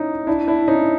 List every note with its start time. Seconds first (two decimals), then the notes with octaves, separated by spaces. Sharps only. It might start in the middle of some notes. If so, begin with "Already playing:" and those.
Already playing: C#4 D#4 E4
0.27 D4 E4
0.47 D4 E4
0.68 C#4 D#4